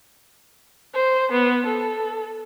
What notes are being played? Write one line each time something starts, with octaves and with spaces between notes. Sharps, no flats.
C5
B3
A4